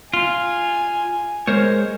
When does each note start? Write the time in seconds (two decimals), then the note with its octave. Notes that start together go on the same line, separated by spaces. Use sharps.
0.14 F4 G#5
1.47 G#3 A#4 C5 C#5